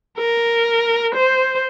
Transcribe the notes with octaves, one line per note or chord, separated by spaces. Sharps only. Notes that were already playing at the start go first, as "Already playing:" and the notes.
A#4
C5